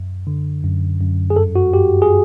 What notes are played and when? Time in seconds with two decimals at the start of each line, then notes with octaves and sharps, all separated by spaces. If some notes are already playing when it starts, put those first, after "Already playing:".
Already playing: F#2
0.27 D3
0.64 F#2
1.01 F#2
1.30 G#4
1.36 G2 A4
1.56 F#4
1.73 G2 G4
2.02 G#4